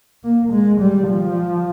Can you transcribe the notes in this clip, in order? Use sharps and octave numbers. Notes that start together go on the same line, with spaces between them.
A#3
G#3
G3
F3